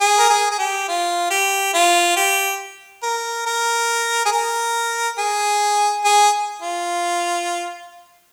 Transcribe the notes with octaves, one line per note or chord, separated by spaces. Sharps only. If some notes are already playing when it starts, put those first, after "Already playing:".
G#4
A#4
G#4
G#4
G4
F4
G4
F4
G4
A#4
A#4
G#4
A#4
G#4
G#4
F4